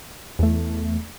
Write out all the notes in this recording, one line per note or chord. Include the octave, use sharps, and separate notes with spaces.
E2 A3